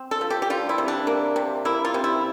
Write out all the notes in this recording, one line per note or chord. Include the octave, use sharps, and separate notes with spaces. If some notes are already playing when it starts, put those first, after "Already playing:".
Already playing: C4
A4
F3
G4
G4
G3 F4
E4
C3
D4
A#3
C3
A#3 E4
F4
C3
E4